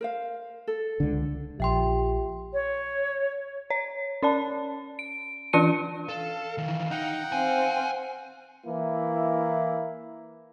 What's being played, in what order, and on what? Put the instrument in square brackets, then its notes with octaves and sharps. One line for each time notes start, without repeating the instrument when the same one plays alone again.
[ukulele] A#4 C5 F5
A4
[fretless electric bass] C#2 D3
[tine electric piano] A#1 [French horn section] F4 G4 [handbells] E5 G5 C6
[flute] C#5
[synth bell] C#5
C#4 D5 A5
D7
E3 D4 F4 A5 C#7 D#7
[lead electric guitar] A4 [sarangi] F5
[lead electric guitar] D#3 E3
[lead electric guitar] D#4 [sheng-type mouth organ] F#5 G5
[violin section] C4 [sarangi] F5 [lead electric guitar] G#5
[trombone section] E3 A#3 E4